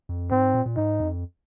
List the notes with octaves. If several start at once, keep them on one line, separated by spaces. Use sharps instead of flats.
F2
G#2 C4
A#2
A#2
G#2 D#4
F2